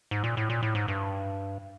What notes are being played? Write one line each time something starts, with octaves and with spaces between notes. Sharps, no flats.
G#2
A#2
A2
A#2
A2
G#2
G2